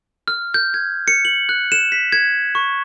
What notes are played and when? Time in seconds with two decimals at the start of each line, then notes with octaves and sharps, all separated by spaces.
0.28 F6
0.54 G6
0.74 G#6
1.08 C#7
1.25 F#7
1.49 F#6
1.72 E7
1.92 B6
2.12 G#6
2.55 C#6